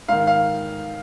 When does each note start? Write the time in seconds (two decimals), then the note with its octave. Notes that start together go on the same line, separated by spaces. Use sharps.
0.08 G#2 D#3 F5
0.27 F5